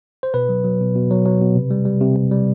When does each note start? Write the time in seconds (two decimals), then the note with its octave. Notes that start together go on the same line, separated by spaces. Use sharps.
0.23 C5
0.34 B2 B4
0.49 F#3
0.64 F#3
0.81 B2
0.95 B2
1.11 F#3
1.26 F#3
1.41 B2
1.56 C3
1.71 G3
1.85 G3
2.01 C3
2.16 C3
2.31 G3